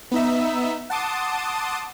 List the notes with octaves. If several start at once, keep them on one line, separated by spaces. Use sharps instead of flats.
B3 D#4 E5
F#5 A5 C6 D6 D#6